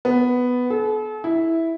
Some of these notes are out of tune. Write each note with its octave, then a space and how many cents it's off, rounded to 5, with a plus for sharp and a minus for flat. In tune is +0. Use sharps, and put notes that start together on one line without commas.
B3 +5
A4 -40
E4 -5